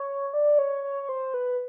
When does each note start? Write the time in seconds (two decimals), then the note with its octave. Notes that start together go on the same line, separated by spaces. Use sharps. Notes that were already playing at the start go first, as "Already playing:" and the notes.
Already playing: C#5
0.33 D5
0.59 C#5
0.84 C#5
1.03 C#5
1.09 C5
1.34 B4